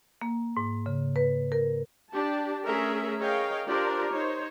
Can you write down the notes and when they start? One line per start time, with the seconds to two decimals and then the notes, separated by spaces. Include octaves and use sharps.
0.22 A#3
0.57 G#2
0.86 C#3
1.16 B4
1.52 A#4
2.11 D4 G4 A5
2.65 A3 C#4 G#4 A#4 E5
3.19 G#4 A#4 C#5 D#5 F5 G5
3.66 D4 F4 G4 A#4 C5 D5
4.11 D#4 C5 C#5